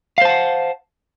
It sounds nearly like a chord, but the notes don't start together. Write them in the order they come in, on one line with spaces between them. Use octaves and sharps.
F5 C5 A5 F#5